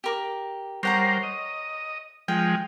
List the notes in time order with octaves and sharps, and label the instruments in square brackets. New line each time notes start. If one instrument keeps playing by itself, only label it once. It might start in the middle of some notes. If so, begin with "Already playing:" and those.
[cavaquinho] G4 A#4 D6
[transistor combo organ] G3 A#4 C5 [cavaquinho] C#5 F#5 A#5
[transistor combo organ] D#5
[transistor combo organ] F3 G#3 [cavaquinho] G5